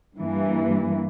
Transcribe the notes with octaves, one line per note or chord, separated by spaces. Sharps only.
G2 E3 A#3